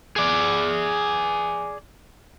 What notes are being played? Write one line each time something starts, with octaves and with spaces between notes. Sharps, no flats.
G#4 D5